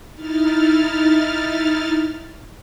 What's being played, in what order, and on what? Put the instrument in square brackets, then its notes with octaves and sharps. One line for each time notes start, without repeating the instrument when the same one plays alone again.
[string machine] D#4 E4 F6 A6